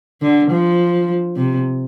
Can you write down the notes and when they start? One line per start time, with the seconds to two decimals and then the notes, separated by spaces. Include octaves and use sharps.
0.22 D3
0.51 F3
1.36 C3